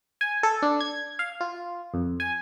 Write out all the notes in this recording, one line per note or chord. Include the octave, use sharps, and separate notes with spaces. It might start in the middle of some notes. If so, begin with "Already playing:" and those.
G#5
A4
D4
G#6
F5
F4
F2
G#5